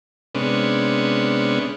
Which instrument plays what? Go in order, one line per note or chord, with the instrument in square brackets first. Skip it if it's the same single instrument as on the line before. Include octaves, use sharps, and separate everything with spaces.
[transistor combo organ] C3 G#3 B3 C#4 D4